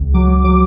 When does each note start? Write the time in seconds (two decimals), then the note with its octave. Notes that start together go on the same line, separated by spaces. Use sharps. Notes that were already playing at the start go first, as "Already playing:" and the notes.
Already playing: C#2
0.14 F#3 D6
0.44 F#3 D6